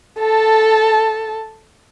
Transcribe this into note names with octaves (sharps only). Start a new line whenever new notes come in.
A4 A5